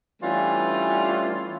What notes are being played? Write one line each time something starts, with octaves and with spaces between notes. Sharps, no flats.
E3 G3 A3 C#4 D4 F4